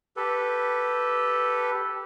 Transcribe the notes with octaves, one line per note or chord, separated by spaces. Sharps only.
G4 A4 B4